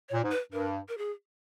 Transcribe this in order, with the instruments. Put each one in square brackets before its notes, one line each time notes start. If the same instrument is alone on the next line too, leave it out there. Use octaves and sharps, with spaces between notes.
[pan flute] C#5
[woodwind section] A#2
G#2
[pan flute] B4
[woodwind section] G2 [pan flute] A#4
[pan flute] A#4
G#4